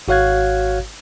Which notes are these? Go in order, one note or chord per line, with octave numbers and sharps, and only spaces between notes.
G#1 F#4 C#5 F5 F#6 G#6